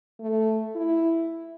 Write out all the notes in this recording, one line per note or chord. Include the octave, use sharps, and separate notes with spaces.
A3
E4